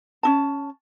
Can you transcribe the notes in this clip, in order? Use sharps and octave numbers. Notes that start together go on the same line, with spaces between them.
C#4 D#4 A5